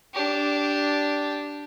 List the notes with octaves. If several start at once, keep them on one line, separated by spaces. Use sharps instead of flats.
D4 G4